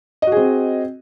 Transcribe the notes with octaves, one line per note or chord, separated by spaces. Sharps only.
C4 F#4 G#4 D#5